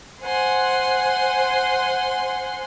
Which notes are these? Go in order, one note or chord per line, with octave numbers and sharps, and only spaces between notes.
C5 F#5 G#5 C6